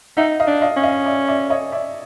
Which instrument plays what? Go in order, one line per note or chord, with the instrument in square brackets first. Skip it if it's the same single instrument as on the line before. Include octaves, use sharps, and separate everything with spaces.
[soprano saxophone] D#4 [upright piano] E5 F#5
[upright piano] D#5 F5
[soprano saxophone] D4
[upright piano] D#5 F5
[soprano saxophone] C#4
[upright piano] D#5 F5
D5 E5
D5 E5
C#5 D#5
D5 E5